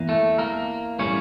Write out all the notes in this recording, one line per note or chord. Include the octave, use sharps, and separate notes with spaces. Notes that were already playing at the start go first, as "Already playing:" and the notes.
Already playing: E2 E3 A#3
A3 A4
A#3 A#4
A2 G3 A#3 C#4 C#5